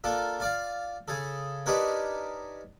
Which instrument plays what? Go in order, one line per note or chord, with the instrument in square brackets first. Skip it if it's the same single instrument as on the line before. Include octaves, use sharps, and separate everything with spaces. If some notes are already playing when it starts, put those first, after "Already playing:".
[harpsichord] A#3 D4 F4 A4
F4 D5 F5
C#3 G#4 A4
D4 D#4 G4 A#4 B4 C#5